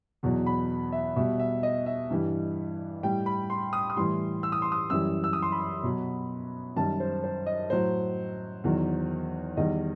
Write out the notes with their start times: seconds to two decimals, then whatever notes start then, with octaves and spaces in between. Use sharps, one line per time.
0.23 E2 B2 F#3
0.46 B5
0.92 E5
1.16 B2 G3 E5
1.40 E5
1.63 D#5
1.86 E5
2.10 G2 E3 G3
3.03 A2 G3 G5
3.26 B5
3.50 C6
3.73 D#6
3.90 D#6
3.97 A2 E3 G3 C6
4.43 E6
4.52 D#6
4.62 C6
4.72 D#6
4.90 F#2 E3 G3 E6
5.24 E6
5.33 D#6
5.42 C6
5.52 B5
5.83 B2 F#3
6.76 F#2 D#3 G3 A5
7.00 C5
7.24 C5
7.46 D#5
7.70 A2 F#3 C5
8.64 E2 D#3 F#3
9.57 E2 D#3 G3 D#5